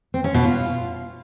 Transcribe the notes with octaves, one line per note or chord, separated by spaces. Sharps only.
C4
C#4
B2
F4